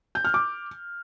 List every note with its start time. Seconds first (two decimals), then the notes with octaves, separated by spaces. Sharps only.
0.15 G6
0.25 F6
0.34 D6